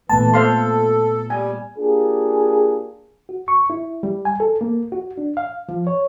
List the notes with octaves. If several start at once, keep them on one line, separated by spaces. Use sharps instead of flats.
A#2 E3 A3 B3 A5
A4 C5 F5 C6
G3 G#5
A#3 D4 F4 G4 G#4
F#4
C#6
E4
G3
G#5
A4
A#3
F#4
D4
F5
F3
C#5